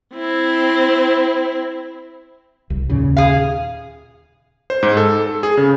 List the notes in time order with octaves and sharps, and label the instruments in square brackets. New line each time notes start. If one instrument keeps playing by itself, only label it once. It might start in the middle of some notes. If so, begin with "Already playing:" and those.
[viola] C4 E4
[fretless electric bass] C2
D#2 A#2 C#3
[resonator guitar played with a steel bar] G#4 F5
[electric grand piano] C5
G#2
A4
A4
G#4
C#3